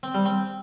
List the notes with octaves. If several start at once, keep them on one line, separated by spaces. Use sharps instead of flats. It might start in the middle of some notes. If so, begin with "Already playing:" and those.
C4
G3
C4